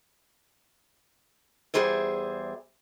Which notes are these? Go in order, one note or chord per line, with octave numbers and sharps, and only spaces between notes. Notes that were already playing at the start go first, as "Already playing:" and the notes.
E2 G2 G3 G#4 C5 E5